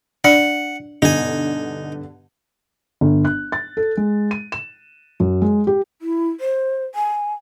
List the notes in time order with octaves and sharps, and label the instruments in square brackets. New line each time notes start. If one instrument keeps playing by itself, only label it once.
[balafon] D4 D5 [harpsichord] F#5
[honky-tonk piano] G2 B2 D3 [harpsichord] D#4 G#5
[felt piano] G1
F#6
A6
A4
G#3
D#7
E7
F#2
G#3
G4
[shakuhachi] E4
C5
G#5